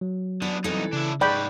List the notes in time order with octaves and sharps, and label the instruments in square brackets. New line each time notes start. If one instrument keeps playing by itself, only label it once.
[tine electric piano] F#3
[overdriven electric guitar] D3 B3 [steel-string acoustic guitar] D5
[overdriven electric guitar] C2 D#4 [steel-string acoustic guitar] E3 A4
[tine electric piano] C#3 [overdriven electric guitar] D4 E4
[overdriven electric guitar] G#2 B4 [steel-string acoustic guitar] G#3 [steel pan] D5 G5 B5 [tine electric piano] C#6